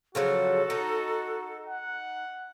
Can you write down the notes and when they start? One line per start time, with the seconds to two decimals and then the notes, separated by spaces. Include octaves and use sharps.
0.15 C#3 F3 F#3 F#4 A4
0.70 D#4
1.66 F#5